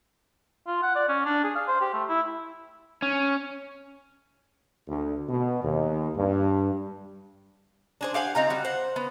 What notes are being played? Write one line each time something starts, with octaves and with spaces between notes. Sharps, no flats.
F4
F#5
D5
C#4
D4
G#4
F5
C5
G4
A3
E4
C#4
D2
B2
D#2
G2
D4 G#4 C5
G4 F5 F#5 G#5
C4 D#4 F4 A#5
G3 F#4
C5 F#5
B3